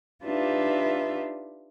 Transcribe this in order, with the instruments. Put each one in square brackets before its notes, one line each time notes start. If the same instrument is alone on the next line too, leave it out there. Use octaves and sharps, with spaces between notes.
[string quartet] D4 D#4 F4 G4 B4 E5